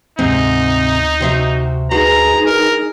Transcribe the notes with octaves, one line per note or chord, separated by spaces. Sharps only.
D2 G#2 C3 C4 D#4
C3 F#4 C5 E5
D#4 F#4 G#4 B4 C5 A#5
A#4